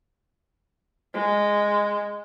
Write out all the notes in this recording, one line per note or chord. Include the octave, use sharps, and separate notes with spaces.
G#3